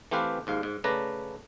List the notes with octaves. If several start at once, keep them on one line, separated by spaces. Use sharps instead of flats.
E3 A3 C4 G4 B4 F5
D#2 G#2 F5
G#2
C#3 A3 B4 D5 A#5